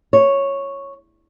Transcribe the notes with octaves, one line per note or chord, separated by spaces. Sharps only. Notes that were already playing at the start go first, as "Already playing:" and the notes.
C#5